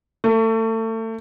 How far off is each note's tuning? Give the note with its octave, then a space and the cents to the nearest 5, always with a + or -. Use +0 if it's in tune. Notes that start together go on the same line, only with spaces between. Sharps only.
A3 +30